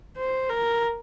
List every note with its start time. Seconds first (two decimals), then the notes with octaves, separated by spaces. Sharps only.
0.17 C5
0.49 A#4